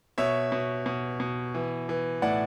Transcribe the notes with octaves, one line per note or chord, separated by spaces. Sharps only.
B2 C#5 E5
B2
B2
B2
E3
E3
A2 D5 F#5